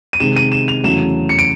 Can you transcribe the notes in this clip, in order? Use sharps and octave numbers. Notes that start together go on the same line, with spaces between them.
D#7
C3 D#3 G#3 E7
D#7
E7
F7
E2 C#3 F#3 A3 E7
C#7
D7